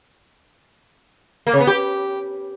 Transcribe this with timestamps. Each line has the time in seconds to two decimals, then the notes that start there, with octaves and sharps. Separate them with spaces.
1.47 A#3
1.53 C#3
1.60 B3
1.67 G4